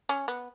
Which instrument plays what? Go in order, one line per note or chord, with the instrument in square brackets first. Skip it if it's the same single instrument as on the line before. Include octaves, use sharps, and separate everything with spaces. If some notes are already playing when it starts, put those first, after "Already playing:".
[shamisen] C#4
B3